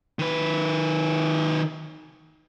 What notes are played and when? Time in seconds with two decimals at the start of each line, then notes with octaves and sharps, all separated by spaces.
0.19 D#3 B4